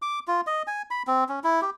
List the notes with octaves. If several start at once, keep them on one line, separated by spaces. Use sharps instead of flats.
D6
F4
D#5
G#5
B5
C4
C#4
E4
G4